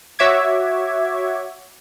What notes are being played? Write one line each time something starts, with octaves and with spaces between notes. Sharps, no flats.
F#4 C#5 E5 D6 G#6